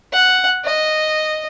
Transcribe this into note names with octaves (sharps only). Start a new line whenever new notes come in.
F#5
D#5